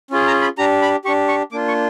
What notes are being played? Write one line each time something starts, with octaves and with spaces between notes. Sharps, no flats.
C#4 F4 G#4
A#5
B5
D4 G4 A#5
B5
D4 G4 C#6
C#6
A#3 D4 F4 D6
C#6